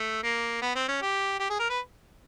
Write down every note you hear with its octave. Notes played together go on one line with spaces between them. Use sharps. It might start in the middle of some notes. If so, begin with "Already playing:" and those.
Already playing: A3
A#3
B3
C4
C#4
G4
G4
G#4
A#4
B4